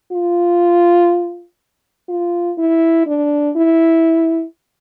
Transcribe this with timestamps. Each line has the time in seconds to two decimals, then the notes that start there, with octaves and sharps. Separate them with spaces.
0.12 F4
2.09 F4
2.58 E4
3.07 D4
3.56 E4